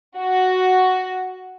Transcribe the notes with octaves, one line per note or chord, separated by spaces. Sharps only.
F#4